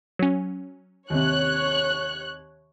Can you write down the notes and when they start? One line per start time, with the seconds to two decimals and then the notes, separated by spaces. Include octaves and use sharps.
0.19 F#3 C#4
1.10 D#2 C3 C#5 F#6